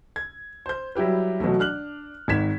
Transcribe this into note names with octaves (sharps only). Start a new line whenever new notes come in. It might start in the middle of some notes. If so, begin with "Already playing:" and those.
G#6
C5 G6
F#3 G3 E4 G4 B4
B2 E3 F#3 A3
D4 F6 F#6 F#7
G#1 D#3 G#6 B6 E7